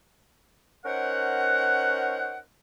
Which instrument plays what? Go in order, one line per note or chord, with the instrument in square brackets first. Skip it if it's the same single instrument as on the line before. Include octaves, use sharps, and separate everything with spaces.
[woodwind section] C#4 D#4 A#4 C5 F#5